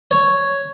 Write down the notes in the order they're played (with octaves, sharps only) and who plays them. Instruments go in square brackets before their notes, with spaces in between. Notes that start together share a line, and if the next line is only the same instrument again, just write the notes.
[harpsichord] C#5